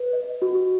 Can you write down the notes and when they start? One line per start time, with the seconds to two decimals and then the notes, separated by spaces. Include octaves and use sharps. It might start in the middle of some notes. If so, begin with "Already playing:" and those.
Already playing: B4
0.13 D#5
0.42 F#4